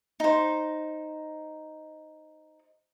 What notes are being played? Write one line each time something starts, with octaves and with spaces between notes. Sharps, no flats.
D#4 C5